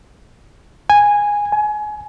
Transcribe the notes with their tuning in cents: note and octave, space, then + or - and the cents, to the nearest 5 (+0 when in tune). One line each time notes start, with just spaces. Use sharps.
G#5 -10
G#5 +25